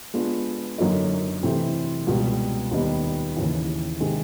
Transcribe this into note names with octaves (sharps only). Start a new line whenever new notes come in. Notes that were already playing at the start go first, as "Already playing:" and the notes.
G#3 B3 D4 F4
F#2 D3 F#3 A#3 D#4
C3 E3 A3 C4
C#2 B2 G3
D#2 D#3 G3 B3 D#4
D#2 C#3 E3
C3 D#3 G#3